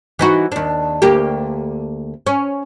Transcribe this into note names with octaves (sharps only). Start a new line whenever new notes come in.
E3 D#4 F#4
D#2 D4
D2 A#3 G4
C#4